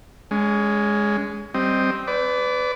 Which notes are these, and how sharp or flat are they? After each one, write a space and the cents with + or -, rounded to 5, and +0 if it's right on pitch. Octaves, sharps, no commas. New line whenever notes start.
G#3 +0 C#4 +25
G3 -15 C4 +0 D#5 +0
B4 +25 D5 -20